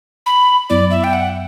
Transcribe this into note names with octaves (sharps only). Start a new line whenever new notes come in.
B5
F#2 F#3 B3 E4 D5
E5
G5
F#5